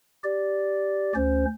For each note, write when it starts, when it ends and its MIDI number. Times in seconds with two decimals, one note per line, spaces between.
0.24 1.13 67
0.24 1.13 74
1.15 1.46 38
1.15 1.46 61
1.15 1.46 72